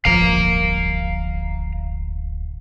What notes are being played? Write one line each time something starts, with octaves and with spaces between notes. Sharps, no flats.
D1 G1 F3 F5 A#5